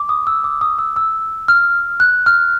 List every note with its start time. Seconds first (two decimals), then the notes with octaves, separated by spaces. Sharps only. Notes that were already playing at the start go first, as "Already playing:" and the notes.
Already playing: D6
0.09 D#6
0.27 E6
0.44 D6
0.61 D#6
0.79 E6
0.96 E6
1.48 F6
2.00 F#6
2.26 F6